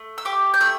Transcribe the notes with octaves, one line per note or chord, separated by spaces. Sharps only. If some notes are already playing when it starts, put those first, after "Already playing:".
Already playing: A3
E6
G4 D6
G6
A3 E6